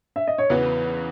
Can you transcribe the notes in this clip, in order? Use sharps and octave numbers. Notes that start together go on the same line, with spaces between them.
E5
D#5
C#5
E2 C#3 E3 B3 F#4 B4